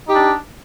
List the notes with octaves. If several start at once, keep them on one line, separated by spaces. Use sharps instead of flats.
D4 D#4 G4